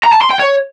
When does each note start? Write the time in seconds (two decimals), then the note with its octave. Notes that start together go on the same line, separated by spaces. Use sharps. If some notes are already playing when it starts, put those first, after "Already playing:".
0.04 A#5
0.13 A5
0.22 C6
0.31 G5
0.40 C#5